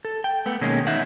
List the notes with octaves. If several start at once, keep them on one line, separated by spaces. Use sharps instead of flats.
A4
G5
A3 B3
B2 D#3 G#3 A#3 C#4
E2 D#4 E5 F#5